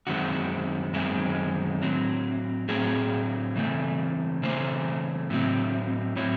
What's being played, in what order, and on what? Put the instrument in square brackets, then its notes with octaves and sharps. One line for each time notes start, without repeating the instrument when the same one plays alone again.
[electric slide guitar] F#2 D#3 G#3 C4 F#4
F#2 D#3 G#3 C4
A2 F#3 C4
A2 F#3 C4 G#4
C#3 E3 A3 C4
C#3 E3 A3 C4 C5
A2 F#3 C4
A2 F#3 C4 C#5